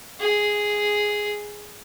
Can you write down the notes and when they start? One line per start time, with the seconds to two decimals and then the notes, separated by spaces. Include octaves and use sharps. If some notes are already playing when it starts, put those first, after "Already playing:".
0.19 G#4